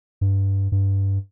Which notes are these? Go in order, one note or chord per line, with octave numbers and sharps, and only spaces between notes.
G2
G2